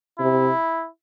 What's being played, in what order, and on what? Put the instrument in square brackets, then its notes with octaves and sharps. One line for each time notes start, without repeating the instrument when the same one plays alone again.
[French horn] C3 [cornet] E4